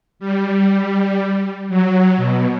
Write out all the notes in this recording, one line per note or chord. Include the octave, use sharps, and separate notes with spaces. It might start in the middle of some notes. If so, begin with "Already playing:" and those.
G3
F#3
B2